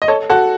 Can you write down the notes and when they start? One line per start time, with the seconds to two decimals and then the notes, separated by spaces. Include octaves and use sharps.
0.02 D#5
0.08 A4 C#5
0.30 F#4 A4